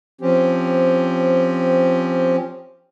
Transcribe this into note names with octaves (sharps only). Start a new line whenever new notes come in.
F3 C4 C#4 G4